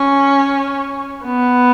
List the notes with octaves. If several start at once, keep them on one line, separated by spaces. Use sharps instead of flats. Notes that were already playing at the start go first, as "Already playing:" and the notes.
Already playing: C#4
B3